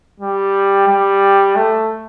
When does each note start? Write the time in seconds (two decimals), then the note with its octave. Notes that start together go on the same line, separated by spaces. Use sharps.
0.20 G3
0.88 G3
1.56 A3